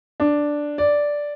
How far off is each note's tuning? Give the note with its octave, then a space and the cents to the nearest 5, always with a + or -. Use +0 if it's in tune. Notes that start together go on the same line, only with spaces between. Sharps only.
D4 +0
D5 -5